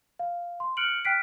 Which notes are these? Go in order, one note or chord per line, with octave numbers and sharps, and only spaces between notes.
F5
C6
F6 F#6 C#7 D7 F#7
G5 F6 F#6 B6 C7 D7